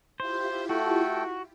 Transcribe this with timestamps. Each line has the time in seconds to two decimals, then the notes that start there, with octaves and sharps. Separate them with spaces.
0.20 E4 F4 G4 C5
0.69 A3 F#4 A4 G5